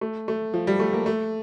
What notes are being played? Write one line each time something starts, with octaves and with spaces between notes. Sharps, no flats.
A3
A3
F3
G3
A3
A#3
A3